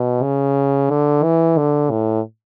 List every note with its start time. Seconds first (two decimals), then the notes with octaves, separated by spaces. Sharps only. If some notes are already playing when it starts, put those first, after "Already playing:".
Already playing: B2
0.22 C#3
0.90 D3
1.23 E3
1.57 D3
1.90 A2